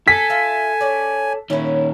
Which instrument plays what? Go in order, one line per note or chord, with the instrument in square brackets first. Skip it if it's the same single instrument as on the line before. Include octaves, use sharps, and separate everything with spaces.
[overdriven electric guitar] A4 [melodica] G#5 [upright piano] B6
[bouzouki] F4 E5
C#4 D5
[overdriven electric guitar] A#2 D#3 [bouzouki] C#4 E4